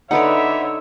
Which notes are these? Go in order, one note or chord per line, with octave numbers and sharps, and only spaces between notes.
D3 D#4 B4 C#5 D5 E5 F#5